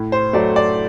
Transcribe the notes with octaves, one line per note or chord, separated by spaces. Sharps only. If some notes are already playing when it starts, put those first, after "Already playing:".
Already playing: A2
C5
F#3 A3 D5
D5